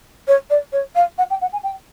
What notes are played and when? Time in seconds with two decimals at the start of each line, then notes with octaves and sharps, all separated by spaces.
0.28 C#5
0.50 D5
0.73 C#5
0.95 F5
1.18 F#5
1.30 G5
1.41 F#5
1.53 G#5
1.64 G5